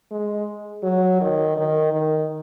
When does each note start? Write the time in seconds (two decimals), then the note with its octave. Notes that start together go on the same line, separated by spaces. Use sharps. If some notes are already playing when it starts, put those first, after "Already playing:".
0.11 G#3
0.83 F#3
1.21 D#3
1.57 D#3
1.93 D#3